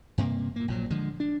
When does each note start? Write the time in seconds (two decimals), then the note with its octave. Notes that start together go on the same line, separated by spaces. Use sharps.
0.18 G2 C3 A#3
0.56 A#2 A#3
0.68 A#1 A#2 F#3
0.90 D3 F3 G#3
1.20 D4